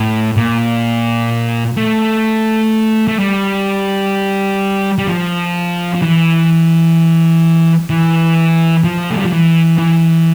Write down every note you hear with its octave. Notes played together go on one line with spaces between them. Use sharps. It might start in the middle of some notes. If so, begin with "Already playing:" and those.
Already playing: A2
A#2
A3
A3
G3
G3
F3
F3
E3
E3
F3
A3
G3
F3
E3
E3